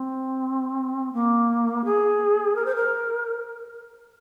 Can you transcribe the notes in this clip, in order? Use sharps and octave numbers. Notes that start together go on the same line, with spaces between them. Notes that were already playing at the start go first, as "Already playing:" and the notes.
Already playing: C4
A#3
G#4
A#4
C5
A#4